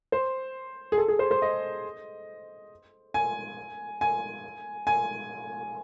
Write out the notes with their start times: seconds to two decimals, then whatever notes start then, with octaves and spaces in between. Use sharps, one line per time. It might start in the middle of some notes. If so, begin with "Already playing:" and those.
0.12 C5
0.92 G#4
0.98 A4
1.08 G#4
1.19 C5
1.31 C5
1.42 D#5
3.14 G#5
4.01 G#5
4.87 G#5